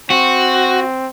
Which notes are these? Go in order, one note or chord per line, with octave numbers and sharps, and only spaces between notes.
C4 F#4